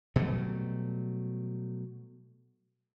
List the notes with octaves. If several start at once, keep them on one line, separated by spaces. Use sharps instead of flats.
B2 F#3 G3 A3